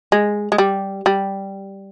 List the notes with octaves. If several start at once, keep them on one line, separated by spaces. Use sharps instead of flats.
G#3
G#3
G3
G3